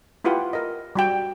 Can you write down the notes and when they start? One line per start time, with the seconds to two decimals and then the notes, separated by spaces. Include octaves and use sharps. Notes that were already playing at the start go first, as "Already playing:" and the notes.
0.24 E4 F4 G4 B4 F#5
0.53 A#4 D#5
0.95 G3 F#4 G5